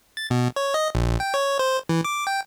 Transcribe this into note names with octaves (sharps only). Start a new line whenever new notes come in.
A6
B2
C#5
D#5
A#1
G5
C#5
C5
E3
D6
G5